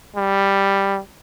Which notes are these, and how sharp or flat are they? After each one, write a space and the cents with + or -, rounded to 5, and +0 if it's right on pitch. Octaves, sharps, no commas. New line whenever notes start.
G3 +5